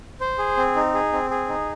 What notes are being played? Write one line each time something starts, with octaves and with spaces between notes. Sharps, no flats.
C5
G#4
C4
D#4
G#4
C4
G#4
D#4